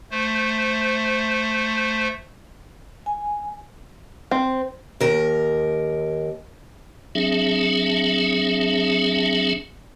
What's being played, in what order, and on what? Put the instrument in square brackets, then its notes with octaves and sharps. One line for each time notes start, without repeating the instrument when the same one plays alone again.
[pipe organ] A3 C5
[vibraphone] G#5
[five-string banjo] C4
[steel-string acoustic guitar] D#2 A#4
[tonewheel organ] F#3 C4 D4 G#4 E5